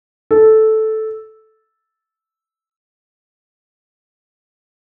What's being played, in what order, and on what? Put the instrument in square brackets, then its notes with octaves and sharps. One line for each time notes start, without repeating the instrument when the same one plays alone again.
[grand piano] A4